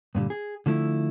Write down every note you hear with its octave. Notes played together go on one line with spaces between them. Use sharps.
G2 A#2 D3 G3
G#4
D3 F3 A3 E4